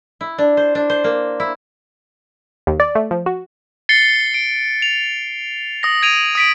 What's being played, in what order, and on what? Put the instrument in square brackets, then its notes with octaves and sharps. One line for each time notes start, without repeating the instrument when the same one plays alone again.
[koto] E4
D4
C5
D4
C5
A#3
E4
[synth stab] D#2
D5
A3
F3
F#4
[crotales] A6 C7 C#7 G7
D7
F7
D#6 A#6
G#6 D7 D#7 F7
D#6 B6 D7